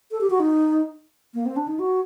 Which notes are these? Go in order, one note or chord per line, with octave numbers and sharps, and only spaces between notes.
A4
G4
F#4
D#4
A#3
C4
D4
D#4
F#4